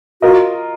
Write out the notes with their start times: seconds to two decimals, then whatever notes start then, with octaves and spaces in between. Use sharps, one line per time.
0.22 F4 F#4 A#4 D#5